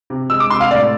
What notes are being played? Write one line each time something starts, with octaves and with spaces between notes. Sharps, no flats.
C3
G#3 E6
D6
C3 C6
F5
A2 D5